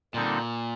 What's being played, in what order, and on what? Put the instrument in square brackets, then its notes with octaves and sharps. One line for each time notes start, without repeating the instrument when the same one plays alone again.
[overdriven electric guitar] A#2 [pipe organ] D3 G3 C4 D#4 A4